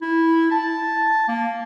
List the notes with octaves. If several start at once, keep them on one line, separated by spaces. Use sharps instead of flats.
E4
A5
A#3